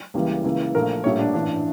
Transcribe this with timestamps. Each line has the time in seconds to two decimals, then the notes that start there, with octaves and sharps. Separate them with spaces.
0.14 C#2 C#3 E3 G3 A#3
0.44 C#2 C#3 E3 A#3
0.74 A#1 A#2 F3 A3 A#4
1.04 A#1 A2 G3 A#3 C#5
1.19 D4
1.33 A1 G2 E3 D4